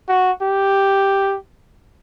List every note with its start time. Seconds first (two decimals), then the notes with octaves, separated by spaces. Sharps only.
0.08 F#4
0.42 G4